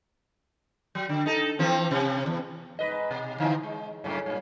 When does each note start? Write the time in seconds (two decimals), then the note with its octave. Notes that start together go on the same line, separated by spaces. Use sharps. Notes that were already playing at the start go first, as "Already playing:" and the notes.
0.95 F#3
1.09 D3
1.26 D#4 A4
1.59 E3 F3 C4
1.91 C3
2.26 E2
2.79 G#2 B4 D#5
3.11 B2
3.40 D3 E3 C4
3.63 G#3
4.04 F#2 A2 C#3
4.26 G2 A#2